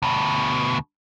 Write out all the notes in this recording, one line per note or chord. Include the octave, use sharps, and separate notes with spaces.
D2 B2